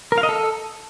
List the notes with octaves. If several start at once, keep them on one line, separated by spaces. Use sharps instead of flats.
A#4
F5
D#5
A4